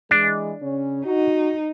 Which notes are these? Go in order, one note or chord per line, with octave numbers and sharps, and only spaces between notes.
E3 G#3 D4
C#3 C#4
D#4 F#4